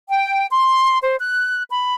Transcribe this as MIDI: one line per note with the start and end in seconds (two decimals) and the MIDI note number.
0.08 0.46 79
0.51 0.96 84
1.02 1.15 72
1.19 1.62 90
1.70 1.94 83